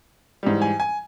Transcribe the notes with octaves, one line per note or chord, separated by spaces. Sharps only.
G#2 E3 G3
G#5
G#5